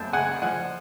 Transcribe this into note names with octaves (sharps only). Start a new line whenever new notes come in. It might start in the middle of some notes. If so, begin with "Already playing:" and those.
Already playing: F#2 G5 A5
C#3 F#5 G#5
F3 F#5 G#5